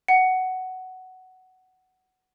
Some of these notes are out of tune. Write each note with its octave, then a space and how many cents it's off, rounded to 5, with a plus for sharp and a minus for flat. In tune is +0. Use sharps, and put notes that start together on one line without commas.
F#5 +10